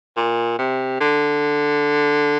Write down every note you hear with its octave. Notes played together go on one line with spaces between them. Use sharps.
A#2
C3
D3